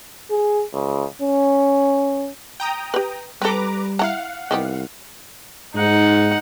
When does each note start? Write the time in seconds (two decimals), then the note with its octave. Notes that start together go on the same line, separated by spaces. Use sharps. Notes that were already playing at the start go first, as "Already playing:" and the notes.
0.30 G#4
0.73 C#2
1.22 C#4
2.60 G5 A#5 D#6
2.94 G4 B4
3.42 G3 C4 A4 B4 A#5 D6
3.99 E4 F5 F#5 A#5
4.51 C2 D#3 B3 G4
5.76 G#2 D#4 F#5